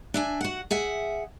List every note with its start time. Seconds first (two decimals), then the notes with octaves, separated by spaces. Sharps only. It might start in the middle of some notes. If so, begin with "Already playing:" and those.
0.14 D4 E5 G#5
0.41 F#4 F#5
0.71 G#4 E5 F#5